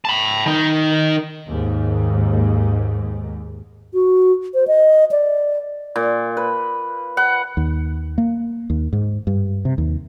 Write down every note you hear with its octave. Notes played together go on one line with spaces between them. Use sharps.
A5 B5
D#3 D#4
D#2 G#2
F#4
C5
D#5
D5
A#2
B4
F#5 B5
D#2
A#3
D#2
G#2
G2
C3
D#2